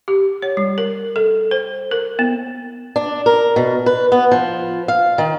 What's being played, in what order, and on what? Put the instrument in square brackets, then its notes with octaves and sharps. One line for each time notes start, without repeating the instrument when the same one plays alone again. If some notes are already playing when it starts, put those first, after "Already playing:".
[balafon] G4
C#5
G3
A#4
A4
C5
A#4
B3
[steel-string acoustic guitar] D4
A#4
B2
B4
B3
F3
F5
D#3